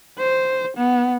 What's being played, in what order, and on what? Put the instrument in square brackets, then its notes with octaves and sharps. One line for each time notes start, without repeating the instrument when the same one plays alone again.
[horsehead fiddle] C5
B3